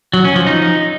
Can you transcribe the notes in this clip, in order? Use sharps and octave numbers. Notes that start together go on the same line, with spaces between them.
F#3
C#4
F3
D#4